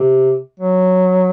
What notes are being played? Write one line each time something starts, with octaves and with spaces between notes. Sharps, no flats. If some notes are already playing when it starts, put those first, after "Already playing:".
Already playing: C3
F#3